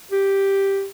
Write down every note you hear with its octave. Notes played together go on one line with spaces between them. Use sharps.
G4